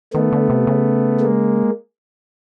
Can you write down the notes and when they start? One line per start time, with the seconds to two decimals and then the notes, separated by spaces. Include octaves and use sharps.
0.14 D#3 A3 B3
0.32 D3
0.50 C3
0.67 C#3
1.20 G#3 A#3